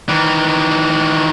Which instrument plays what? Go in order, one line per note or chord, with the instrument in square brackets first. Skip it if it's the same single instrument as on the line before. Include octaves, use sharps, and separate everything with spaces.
[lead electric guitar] D#3 E3